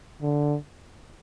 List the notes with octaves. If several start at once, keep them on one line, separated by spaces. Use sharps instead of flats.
D3